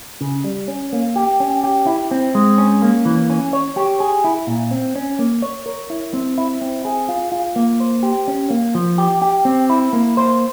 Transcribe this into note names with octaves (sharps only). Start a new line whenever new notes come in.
C#3
G3
C#4
A#3
G4
C#4
G4
E4
C4
G#3
C#4
A#3
E3
C#4
C#5
G4
G#4
E4
A#2
C4
C#4
A#3
C#5
A#4
E4
C4
E4
C4
G#4
F4
F4
A#3
C5
G4
C#4
A#3
F3
G4
G4
C4
E4
A#3
C5